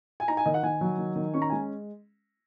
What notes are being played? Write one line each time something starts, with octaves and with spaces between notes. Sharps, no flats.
G#5
D#4 A#5
G#5
D#3 D#5
F#5
D#3 G#5
F#3
D#3
D#3
C#4 C#6
A#5
G#3 G#5